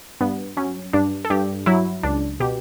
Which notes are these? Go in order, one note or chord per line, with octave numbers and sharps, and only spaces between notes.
G2 B3
F#3 C#4
G2 D4
A4
G2 G4
F#3 E4
C#2 D4
B2 G4